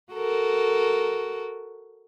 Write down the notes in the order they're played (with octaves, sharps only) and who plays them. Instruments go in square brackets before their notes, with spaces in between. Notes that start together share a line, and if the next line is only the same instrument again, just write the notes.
[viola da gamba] F#4 A4 A#4